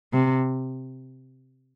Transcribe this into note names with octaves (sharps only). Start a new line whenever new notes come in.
C3